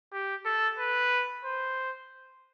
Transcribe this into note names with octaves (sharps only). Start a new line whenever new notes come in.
G4
A4
B4
C5